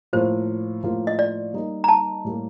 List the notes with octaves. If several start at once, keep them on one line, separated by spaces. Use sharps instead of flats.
A2 F3 A#3 F4 C5
A2 F3 A#3 F4
D#5
D5
G3 A#3 D#4 A#4
A#5
A5
A2 G3 A#3